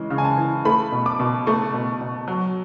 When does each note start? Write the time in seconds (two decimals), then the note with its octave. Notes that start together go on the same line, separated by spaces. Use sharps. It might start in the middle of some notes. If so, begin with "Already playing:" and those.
Already playing: C#3 E3 G#3
0.10 C#3
0.18 G#5
0.25 A5
0.37 E3
0.65 A3 B5
0.92 B2
1.06 D6
1.20 B2
1.47 A3 C#6
1.74 B2
2.01 B2
2.28 F#3